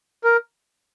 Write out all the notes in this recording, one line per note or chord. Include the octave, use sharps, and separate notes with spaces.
A#4